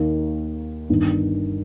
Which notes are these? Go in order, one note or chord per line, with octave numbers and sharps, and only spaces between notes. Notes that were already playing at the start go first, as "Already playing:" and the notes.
Already playing: D#2 D#3 A#3
G1 G2 D#3